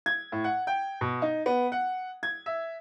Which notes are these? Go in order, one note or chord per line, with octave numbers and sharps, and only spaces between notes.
G#6
A2
F#5
G5
B2
D#4
B3
F#5
G#6
E5